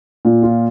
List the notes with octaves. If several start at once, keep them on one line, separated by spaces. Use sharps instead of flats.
A#2
F4